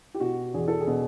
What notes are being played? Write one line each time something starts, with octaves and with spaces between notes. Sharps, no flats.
G4
B2 F#4
E2 G#4
A4
G#4
B2